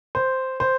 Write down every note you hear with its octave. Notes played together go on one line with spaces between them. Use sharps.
C5
C5